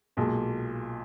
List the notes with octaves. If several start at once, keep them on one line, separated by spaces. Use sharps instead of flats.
B1 A#2 G#3